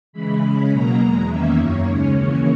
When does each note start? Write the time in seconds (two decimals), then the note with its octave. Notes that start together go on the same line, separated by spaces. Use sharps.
0.13 C#3 E3 G#3 B5
0.41 C#3 G#3 C#4
0.71 B2 F#3 A#3 A#5
1.00 E2 B2 G#3
1.28 E2 D#3 A#3 C#4 E5
1.56 F#2 D#3 A#3 C#5
1.86 D#2 C#3 G#3 C#4
2.14 D#2 C#3 E3 A#3 C#4 C#5